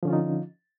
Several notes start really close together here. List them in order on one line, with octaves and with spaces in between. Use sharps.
F3 D3 C#4 F4 D#4